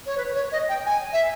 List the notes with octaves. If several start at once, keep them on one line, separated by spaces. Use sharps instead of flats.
C#5
B4
B4
C#5
D#5
G5
G#5
E5